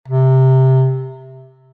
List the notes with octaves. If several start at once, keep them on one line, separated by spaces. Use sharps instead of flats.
C3